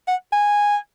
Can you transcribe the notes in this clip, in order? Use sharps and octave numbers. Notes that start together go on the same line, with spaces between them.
F#5
G#5